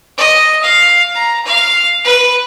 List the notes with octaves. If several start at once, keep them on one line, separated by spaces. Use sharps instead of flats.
D#5
F5
A#5
F5
B4